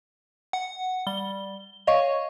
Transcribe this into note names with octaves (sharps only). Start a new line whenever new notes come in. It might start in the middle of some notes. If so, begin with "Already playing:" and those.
F#5
G3 G7
C#5 D#5 F5 C#6